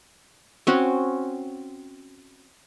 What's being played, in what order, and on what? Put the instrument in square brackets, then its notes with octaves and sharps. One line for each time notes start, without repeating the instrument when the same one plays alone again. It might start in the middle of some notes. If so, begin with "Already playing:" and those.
[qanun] C4 C#4 F#4